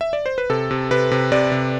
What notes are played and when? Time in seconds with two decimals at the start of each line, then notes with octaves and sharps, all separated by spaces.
0.01 E5
0.13 D5
0.26 C5
0.38 B4
0.50 C3 A4
0.71 C3
0.91 C3 B4
1.11 C3
1.32 C3 D5
1.52 C3